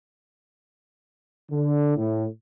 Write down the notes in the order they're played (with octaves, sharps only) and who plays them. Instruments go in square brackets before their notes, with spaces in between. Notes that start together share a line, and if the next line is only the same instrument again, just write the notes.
[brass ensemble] D3
A2